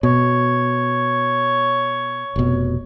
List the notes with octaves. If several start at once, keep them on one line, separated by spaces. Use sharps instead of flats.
B2 C#5
F1 B2